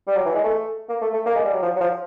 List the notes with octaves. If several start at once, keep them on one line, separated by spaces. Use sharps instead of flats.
G3
F#3
E3
G#3
A3
A#3
A3
A3
A#3
G#3
G3
F#3
F3
F#3
F3